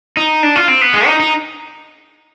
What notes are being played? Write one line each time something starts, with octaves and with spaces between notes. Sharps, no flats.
D#4
D4
F4
C4
B3
G#3
D#4
D#4